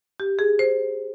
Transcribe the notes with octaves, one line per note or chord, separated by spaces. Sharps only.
G4
G#4
C5